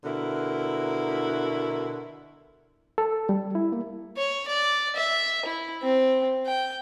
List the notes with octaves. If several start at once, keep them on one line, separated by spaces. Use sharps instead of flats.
B2 D3 E4 A#4
A4
G3
E4
A#3
C#5
D5
E5
E4
C4
G5